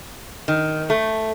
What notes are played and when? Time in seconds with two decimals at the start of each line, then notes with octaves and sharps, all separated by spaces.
0.48 D#3
0.90 A3